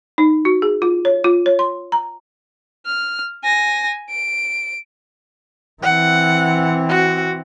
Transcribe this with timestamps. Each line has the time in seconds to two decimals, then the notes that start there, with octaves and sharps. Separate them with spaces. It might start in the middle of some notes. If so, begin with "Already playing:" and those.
0.18 D#4
0.45 F#4
0.62 G#4
0.82 F4
1.05 C#5
1.24 F4
1.46 C#5
1.59 C6
1.92 A#5
2.86 F6
3.43 G#5 A#6
4.10 D7
5.83 E3 C4 F#5
6.89 F#4